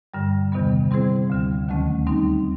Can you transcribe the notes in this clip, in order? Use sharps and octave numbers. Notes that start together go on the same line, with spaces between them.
G2 D3 G3
E2 C3 D#3 G3 B3
G3 C4 E4 G#4 C5
D2 D3 G3
D#2 D#3 F#3 A3 C#4
G3 C4 D#4